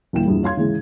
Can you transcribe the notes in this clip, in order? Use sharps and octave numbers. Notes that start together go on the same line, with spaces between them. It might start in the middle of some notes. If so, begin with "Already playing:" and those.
D#1 A#2 E3 G5 E7
A#1 E2 G2
C#5 F5 C6 G#6
G#2 C#3 E3